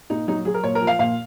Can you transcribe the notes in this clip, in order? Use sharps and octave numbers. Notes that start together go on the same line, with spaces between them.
A#2 D#4
F#3 D#4
F#3 G#4
A#4
A#2 C#5
A#4
F3
F5
A#2 F5